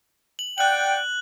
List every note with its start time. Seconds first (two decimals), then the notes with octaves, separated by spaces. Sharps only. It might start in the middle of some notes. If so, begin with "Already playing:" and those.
0.39 F#7
0.58 D5 F#5 G5 F#6 F#7